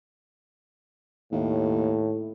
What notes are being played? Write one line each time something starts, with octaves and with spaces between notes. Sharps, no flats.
D#2 A2